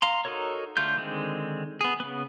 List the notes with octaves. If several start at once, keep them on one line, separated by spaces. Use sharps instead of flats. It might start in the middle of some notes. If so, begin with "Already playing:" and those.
F5 A#5 C6
D#4 F#4 A4 A#4 C#5
D3 A3 F4 G6
D3 D#3 G#3 C4
B3 G#4
C#3 B3